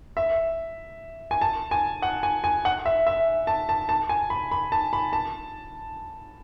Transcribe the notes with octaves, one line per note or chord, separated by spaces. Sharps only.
E5
G#5
A5
G#5
F#5
G#5
G#5
F#5
E5
E5
A5
A5
A5
G#5
B5
B5
A5
B5
A5